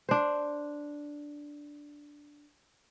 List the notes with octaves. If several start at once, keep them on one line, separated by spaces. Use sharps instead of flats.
D4 C5